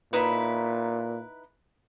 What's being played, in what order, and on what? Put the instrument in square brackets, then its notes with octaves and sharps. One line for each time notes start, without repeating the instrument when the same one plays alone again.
[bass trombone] A#2 [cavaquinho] D#4 E4 B4